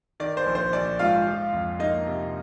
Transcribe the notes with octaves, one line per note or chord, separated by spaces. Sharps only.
D#3 D5
C5
A#1
C5
A#1 D5
G#2 F4 F5
F3
F2
A#3 D#4 D#5
C3